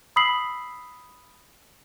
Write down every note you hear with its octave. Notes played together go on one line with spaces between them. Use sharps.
B5 D#6 E6 B6 C7 F#7